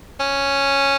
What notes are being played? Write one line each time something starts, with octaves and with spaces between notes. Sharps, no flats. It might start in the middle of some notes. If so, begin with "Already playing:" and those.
C#4